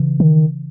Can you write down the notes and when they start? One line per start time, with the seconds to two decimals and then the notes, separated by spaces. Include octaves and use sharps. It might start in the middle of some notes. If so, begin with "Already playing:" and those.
Already playing: C#3 E3
0.20 D#3